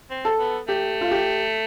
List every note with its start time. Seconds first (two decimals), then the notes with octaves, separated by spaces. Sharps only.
0.11 C4
0.25 A4
0.39 B3
0.68 A3 G4
1.01 F4
1.11 G4